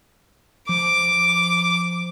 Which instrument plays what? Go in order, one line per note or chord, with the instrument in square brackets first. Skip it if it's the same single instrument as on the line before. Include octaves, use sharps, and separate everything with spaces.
[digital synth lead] F3 [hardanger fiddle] D6